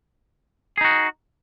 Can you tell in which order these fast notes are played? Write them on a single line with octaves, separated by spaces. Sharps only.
G#4 D#4 F#4